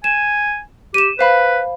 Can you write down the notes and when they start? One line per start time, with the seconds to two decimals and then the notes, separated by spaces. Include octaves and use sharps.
0.04 G#5 E7
0.94 G4 D#7 E7
1.19 B4 C5 F5 B5